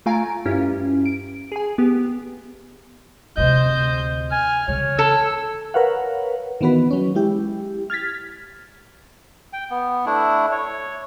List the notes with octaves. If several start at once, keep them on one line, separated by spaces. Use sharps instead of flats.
A3 F4 F5 G#5 A#5 D7
G2 C#4 E4 F4 G4
D7
G#4 G#5
B3 G4
D2 C3 C5 D#5 G6
G#5 F6
C#3 E3 C#5
A4 E6
A#4 B4 C#5 F5 F#5
D#3 E3 B3 F#4 B4
F#3 C#4
G#3 E4 G4
F6 G#6 A6 B6
G5
B3
A3 D4 E4
C#5